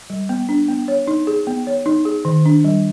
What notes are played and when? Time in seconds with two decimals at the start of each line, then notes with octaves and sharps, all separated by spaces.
0.10 G3
0.29 B3
0.49 D4
0.68 B3
0.88 C#5
1.07 D#4
1.27 G#4
1.47 B3
1.67 C#5
1.86 D#4
2.05 G#4
2.25 D#3
2.46 D4
2.65 G3